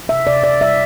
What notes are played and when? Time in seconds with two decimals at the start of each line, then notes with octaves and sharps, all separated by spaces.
0.09 C3 E5
0.26 C3 D5
0.43 C3 D5
0.61 G3 E5